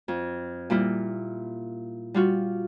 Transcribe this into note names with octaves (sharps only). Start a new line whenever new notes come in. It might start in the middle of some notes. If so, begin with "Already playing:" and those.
F2
A#2 G3 A#3 E4 F4
G3 F4 F#4